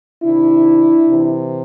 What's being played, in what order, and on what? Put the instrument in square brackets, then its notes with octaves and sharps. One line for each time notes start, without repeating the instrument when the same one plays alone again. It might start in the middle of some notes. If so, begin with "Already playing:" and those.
[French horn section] C3 D#3 D4 E4
C3 E3